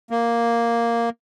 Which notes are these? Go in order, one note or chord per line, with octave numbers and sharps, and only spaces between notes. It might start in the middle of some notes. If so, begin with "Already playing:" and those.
A#3